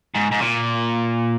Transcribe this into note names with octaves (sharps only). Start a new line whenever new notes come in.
G#2
G#2
A#2